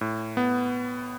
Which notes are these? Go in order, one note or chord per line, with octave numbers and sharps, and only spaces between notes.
A2
B3